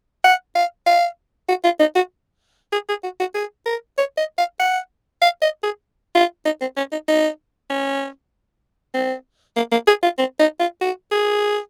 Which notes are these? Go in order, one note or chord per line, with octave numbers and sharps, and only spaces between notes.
F#5
F5
F5
F#4
F4
D#4
F#4
G#4
G#4
F#4
F#4
G#4
A#4
C#5
D#5
F5
F#5
F5
D#5
G#4
F4
D#4
C4
C#4
D#4
D#4
C#4
C4
A#3
A#3
G#4
F4
C4
D#4
F4
F#4
G#4